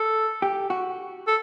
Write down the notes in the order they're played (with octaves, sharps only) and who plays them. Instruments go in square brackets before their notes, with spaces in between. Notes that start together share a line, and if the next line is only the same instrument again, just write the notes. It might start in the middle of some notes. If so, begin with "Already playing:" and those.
Already playing: [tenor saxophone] A4
[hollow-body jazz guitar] G4
F#4
[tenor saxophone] A4